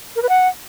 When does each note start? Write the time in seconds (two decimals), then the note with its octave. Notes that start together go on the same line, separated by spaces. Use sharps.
0.16 A#4
0.22 B4
0.29 F#5